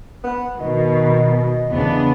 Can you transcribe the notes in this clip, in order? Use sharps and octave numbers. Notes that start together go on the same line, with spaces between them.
B3
B2 D#3 D#5
E2 C#3 B3 D4